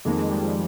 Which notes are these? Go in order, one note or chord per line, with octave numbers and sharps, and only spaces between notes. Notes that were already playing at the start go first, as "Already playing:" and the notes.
F2 D#3 G#3 A#3
G#3
G3
F3